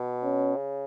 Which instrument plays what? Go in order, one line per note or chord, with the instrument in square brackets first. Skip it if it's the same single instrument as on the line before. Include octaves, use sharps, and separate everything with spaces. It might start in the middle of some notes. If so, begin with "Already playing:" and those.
Already playing: [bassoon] B2
[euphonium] C#4
[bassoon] C#3